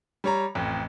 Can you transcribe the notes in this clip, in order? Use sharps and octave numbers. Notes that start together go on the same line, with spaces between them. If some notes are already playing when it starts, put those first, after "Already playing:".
G3 C#5 A#5
A1 F2